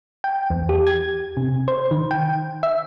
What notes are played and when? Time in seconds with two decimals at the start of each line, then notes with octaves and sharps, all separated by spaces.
0.24 G5
0.50 E2
0.69 G4
0.87 G#6
1.37 C3
1.68 C5
1.91 D#3
2.11 G5
2.63 E5